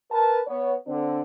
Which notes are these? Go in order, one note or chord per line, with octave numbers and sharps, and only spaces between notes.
A#4 B4 A5
B3 C#5
D3 C4 D4